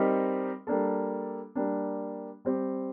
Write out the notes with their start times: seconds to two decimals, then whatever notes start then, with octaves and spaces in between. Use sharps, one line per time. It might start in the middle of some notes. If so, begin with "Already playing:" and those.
Already playing: G3 C4 D#4 G4 A#4
0.67 G3 A#3 D4 A4
1.55 G3 A#3 D4
2.45 G3 C4 G4